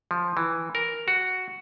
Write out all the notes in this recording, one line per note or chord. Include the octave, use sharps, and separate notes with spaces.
F3
E3
A#4
F#4